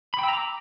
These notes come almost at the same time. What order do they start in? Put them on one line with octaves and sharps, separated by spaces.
B5 G5 E6 A#5 D6